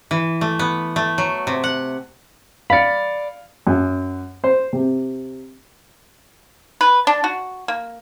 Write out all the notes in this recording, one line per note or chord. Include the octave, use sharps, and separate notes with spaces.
E3
A3
B3
A3
F#3
C3
F#5
D5 F5 B5 C#7
F#2
C5
C3
B4
D4
F#4
A#3